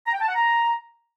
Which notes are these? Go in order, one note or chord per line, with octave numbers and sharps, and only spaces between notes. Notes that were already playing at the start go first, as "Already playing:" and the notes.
A#5
G5
A5
F#5
A#5